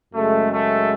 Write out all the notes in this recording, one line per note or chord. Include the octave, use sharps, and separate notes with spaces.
F#2 C#3 G#3 A3
A3